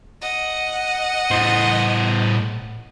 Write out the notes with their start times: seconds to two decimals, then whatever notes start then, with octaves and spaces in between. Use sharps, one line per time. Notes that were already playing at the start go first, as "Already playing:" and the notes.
0.22 D#5 F#5
1.31 A2 C5